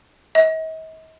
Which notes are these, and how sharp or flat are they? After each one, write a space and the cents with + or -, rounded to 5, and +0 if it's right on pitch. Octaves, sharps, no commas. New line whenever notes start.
D#5 +45